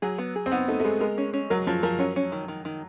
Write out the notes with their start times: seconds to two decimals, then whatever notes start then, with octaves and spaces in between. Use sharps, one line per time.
0.02 F#3 G#4
0.18 B3
0.36 G#4
0.46 C4
0.52 B3 D#4
0.68 A3 D#4
0.80 A3
0.85 G#3 B3
1.01 G#3 A#4
1.18 C#4
1.33 C#4
1.50 F#3 A#4
1.67 F3 C#4
1.83 F3 A#4
1.99 F#3 C#4
2.16 C#4
2.32 D#3
2.48 D#3
2.65 D#3